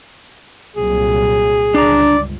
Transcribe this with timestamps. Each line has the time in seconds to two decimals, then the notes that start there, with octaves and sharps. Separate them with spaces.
0.76 C2 A#2 F#3 G#4
1.75 G1 C#2 D4 D5 A#5